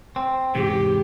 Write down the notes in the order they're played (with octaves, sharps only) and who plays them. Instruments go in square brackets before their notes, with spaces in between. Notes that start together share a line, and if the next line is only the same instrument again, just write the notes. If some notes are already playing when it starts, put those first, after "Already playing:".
[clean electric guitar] C4
[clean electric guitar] E2 G#2 C3 [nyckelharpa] G4